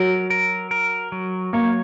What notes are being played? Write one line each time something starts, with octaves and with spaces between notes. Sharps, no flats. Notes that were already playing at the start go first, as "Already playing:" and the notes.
Already playing: F#3 A#4
A#4
A#4
F#3
A#3 C#5